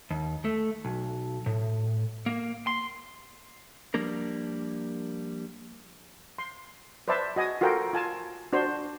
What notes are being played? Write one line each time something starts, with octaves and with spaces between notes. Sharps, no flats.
D#2
A3
B1
A2
A#3
C6
F3 G3 A#3 D4 A#4
C6
B4 C5 D5 E5 A5
F#4 D#5 G#5 D#6
F4 F#4 A4 A#4 G5
F4 G#5 A5
D4 F#4 C5